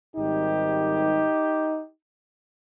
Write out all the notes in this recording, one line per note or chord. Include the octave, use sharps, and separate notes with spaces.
G#1 G#2 D#3 G3 D#4 G4